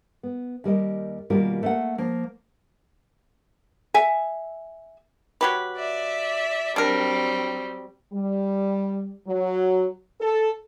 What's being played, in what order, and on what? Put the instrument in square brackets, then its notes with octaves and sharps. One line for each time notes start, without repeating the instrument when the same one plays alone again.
[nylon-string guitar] B3
D#2 G3 A#4 D#5
D#2 B2 G3 F4 A#4
A3 A#3 F#5
F3 A#3
[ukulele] E5 G#5
[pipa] F#3 G4 B4
[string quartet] D5 E5
[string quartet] F#3 G3 C4 [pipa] D4 A#4
[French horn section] G3
F#3
A4